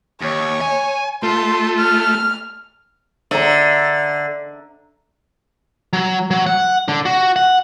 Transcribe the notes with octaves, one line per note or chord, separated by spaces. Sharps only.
D#2 C#5
G#5
A3 F4 C6
F6
D3 E5 A#5
F#3
F#3
F#5
D3
F#4
F#5